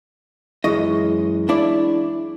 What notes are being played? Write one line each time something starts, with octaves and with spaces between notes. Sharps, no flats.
F#2 E3 G#3 D#5 C#6
D4 E4 D5